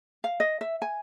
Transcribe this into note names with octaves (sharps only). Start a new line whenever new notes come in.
F5
D#5
E5
G#5